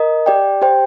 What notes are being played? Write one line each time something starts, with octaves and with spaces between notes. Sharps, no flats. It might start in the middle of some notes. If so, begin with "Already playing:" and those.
Already playing: A#4 D#5
G4 D5 G5
G4 C5 G5